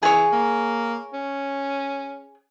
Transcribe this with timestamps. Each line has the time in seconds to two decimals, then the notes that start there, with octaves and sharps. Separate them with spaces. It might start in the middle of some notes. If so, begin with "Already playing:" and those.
0.03 E3 G#4 C#5
0.33 A#3
1.13 C#4